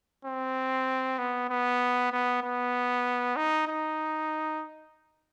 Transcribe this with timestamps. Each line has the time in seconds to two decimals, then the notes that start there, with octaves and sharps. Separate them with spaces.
0.25 C4
1.18 B3
1.49 B3
2.12 B3
2.42 B3
3.36 D#4
3.68 D#4